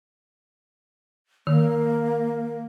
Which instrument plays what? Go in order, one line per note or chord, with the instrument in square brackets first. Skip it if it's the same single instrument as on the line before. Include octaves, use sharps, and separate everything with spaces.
[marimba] D#3 [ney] A#3